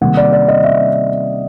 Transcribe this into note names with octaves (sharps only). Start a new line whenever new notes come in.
C3 D#3 G3 A#3 F#5
D5
D5
D#5
E5